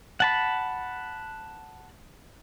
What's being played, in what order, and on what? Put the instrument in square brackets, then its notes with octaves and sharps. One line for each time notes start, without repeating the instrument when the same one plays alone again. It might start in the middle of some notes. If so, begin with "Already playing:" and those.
[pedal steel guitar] F#5 A5 B5